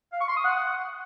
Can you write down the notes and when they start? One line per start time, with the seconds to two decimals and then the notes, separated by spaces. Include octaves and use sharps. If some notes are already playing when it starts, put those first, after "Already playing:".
0.13 F5
0.21 C#6
0.29 C6
0.36 D#6
0.44 F#5